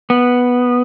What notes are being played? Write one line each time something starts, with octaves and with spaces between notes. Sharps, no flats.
B3